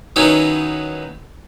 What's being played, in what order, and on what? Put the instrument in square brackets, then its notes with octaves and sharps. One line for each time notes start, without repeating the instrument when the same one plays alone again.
[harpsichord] D#3 F#3 B3 C#4 D#4 E4